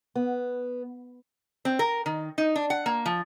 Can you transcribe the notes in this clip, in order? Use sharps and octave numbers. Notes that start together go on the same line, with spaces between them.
B3
C4
A#4
D#3
D#4
D4
F#5
A#3
F3